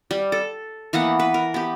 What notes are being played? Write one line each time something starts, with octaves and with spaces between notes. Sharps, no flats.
G3
A4
E3 A#3 B3 F#5
B4
A#4
B3 G4